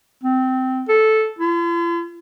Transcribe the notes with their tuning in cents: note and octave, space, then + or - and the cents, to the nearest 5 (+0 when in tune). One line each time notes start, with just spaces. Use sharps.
C4 -15
A4 -10
F4 -45